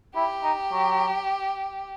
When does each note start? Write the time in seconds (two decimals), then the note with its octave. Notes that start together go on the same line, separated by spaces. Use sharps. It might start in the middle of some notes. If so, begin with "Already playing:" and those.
0.15 E4 G4
0.43 D#4
0.72 F#3